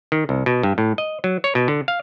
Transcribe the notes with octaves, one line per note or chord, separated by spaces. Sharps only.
D#3
C2
B2
G2
A2
D#5
F#3
C#5
B2
D3
F5